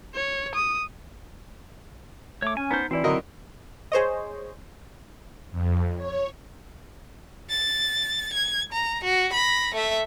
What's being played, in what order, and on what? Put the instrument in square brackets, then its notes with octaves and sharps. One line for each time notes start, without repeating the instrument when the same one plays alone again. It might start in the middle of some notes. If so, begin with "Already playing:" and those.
[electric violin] C#5
D#6
[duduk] A3 [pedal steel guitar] C#5 D6
[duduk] C#4 [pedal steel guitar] G#5
[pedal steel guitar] B3 C5 [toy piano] D#4 B4 A#5
[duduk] E3 [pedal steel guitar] C4 E4 [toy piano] F#4 D5
[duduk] D3 [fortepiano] F#3 A#4 D#5 [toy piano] F#4
[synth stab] G#4 C5 C#5 D#5
[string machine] F2
C#5
[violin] A6
G#6
A#5
F#4
B5 A#6
A3 E5